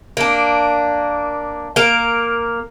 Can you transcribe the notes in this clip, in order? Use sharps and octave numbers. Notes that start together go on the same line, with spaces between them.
A#3 D4
A#3 A#4